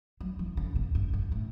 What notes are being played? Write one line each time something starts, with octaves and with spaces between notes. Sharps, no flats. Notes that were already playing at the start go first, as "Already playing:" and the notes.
F#3
E3
D3
C3
G2
G2
A2